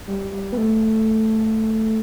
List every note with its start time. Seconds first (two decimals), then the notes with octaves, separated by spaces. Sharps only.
0.07 G3
0.32 G3
0.53 B3
0.58 A3